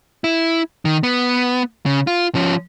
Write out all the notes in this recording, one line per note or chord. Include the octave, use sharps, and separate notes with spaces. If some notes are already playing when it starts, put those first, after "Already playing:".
E4
D#3
B3
C#3
F4
F3 C#4